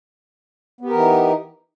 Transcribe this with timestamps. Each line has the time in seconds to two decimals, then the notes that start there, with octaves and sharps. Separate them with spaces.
0.81 B3
0.85 G4
0.89 A#4
0.94 E3
0.98 D#4